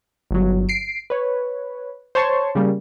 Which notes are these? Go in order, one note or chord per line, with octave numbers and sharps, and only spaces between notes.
G1 F#3
C7 D7
B4 C#5
C5 C#5 A5 C6 C#6
C#3 G3 A#3